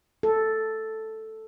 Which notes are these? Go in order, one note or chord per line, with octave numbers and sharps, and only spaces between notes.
A4